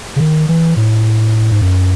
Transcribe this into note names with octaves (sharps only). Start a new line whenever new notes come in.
C#3
D#3
E3
A2
G#2
F#2